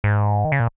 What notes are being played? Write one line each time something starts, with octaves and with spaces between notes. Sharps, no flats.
G#2
D#3
C#3
A#2